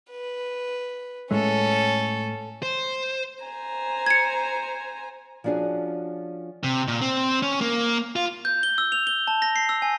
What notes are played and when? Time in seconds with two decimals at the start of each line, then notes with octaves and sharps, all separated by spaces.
0.11 B4
1.31 A2 G#3 A3 C#4 A4
2.63 C5
3.44 C5 G#5 A#5
4.06 G#6 C#7
5.44 F3 C#4 D4 F#4 G#4
6.64 C3
6.88 A#2
7.02 C4
7.42 C#4
7.61 A#3
8.16 F4
8.45 G6
8.63 G7
8.78 E6
8.92 F7
9.07 G7
9.27 A5
9.42 A#6
9.56 C7
9.69 E6
9.82 G#5